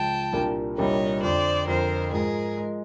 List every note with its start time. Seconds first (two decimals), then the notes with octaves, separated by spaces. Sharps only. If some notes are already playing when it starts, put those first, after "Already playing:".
Already playing: C#2 C#3 F3 G5 A5
0.33 C2 A#2 G3 A#3 D4
0.77 C2 A#2 G3 A#3 D4 C#5 D#5
1.23 F2 D3 F3 C5 D5
1.67 F2 D3 F3 A#4 C5
2.12 G#2 F3 G#3 G#4 A#4
2.57 F3 G#3